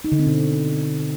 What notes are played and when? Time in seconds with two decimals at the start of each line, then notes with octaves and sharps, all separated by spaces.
0.04 D#4
0.12 D3
0.19 C4
0.27 B2